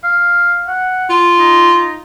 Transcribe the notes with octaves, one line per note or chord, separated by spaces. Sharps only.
F5
F#5
F4
D#4
D#4